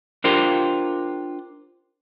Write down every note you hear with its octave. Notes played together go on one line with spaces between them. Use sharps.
D4 F4 G4 A#4 C5